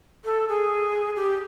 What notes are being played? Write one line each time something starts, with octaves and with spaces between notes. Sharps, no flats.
A4
G#4
G4